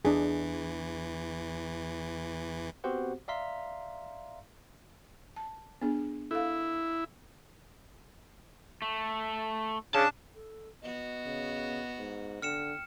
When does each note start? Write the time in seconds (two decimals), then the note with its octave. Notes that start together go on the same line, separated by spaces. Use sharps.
0.05 E2 E3 D4 G#4
2.84 B3 C4 F#4 G4 C5 F#5
3.28 D5 E5 F5 A#5 C6 B6
5.36 A5
5.82 B3 D4 G#4
6.31 E4 A4 F5
8.82 A3
9.95 C#3 D4 A5
10.35 A4
10.82 B3 F#4 D#5
11.26 C#3
11.98 G#2
12.42 D3 G5 F6 C#7 E7